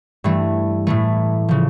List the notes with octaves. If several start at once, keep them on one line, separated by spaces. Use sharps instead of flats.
G2 E3 A3
A2 E3 A3
C#3 F3